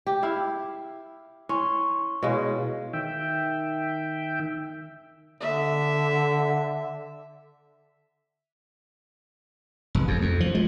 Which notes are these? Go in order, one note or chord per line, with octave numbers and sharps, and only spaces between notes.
G4
E4 F5
C#4 E4 C6 C#6
B2 G#3 E4 C#5 F5
D#3 E5 G5
D3 E5
F1
F2
F2
F3
G#3